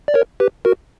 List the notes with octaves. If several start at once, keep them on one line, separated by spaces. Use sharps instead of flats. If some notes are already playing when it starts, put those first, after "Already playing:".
D5
A#4 C#5
G4 B4
F#4 A#4